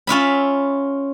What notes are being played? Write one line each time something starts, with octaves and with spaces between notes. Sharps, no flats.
C#4 F4 E5 B5